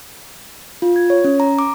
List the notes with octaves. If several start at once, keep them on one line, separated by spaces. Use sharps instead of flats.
F4
G#6
C#5
C#4
A#5
D6